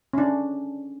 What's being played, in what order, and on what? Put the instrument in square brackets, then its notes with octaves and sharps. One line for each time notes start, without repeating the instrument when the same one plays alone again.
[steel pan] C#4 D4